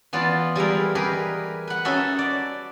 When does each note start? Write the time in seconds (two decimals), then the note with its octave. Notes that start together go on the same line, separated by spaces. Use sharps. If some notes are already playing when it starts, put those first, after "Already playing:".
0.13 E3 B3 F4 D5
0.55 G3 G#3 E4 A#4
0.95 G4 G#4 A#4 B4
1.67 B4 F#5
1.85 C#4 D#4 F#4 A4 E5
2.19 D5